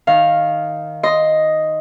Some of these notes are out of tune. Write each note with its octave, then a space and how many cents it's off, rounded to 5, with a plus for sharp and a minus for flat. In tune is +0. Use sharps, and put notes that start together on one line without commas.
D#3 +0 F5 +0
D#5 +5 C6 +0